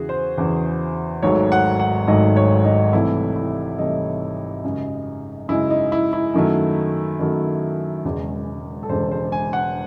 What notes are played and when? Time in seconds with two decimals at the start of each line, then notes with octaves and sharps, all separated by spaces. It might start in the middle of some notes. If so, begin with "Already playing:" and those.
Already playing: E2 C#3 E3 F#4 G#4
0.09 C5
0.38 E2 C#3 E3
1.23 G#1 G#2 F#3 A3 C#5
1.52 F#5
1.80 F#5
2.07 G#1 G#2 F#3 A3 D#5
2.36 C#5
2.65 D#4
2.93 C2 C3 E3 A3 E4
3.36 E4
3.78 C2 C3 E3 A3 D#4
4.64 F#2 C#3 G#3
5.48 F#2 C#3 G#3 E4
5.70 D#4
5.92 E4
6.13 E4
6.34 F#2 D#3 F#3 A3
7.19 F#2 D#3 F#3 A3
8.05 E1 E2 C#3 G#3
8.83 A4
8.89 E1 E2 C#3 G#3 C5
9.11 C5
9.32 G#5
9.53 F#5